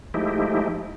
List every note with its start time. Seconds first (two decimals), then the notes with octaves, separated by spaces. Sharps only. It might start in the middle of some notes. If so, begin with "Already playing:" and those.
0.14 F3 G#3 A3 D#4 E4 G4